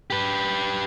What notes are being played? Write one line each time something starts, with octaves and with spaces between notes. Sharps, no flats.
G4 B4